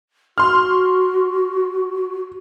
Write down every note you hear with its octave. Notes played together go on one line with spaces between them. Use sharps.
F#4 C6 F6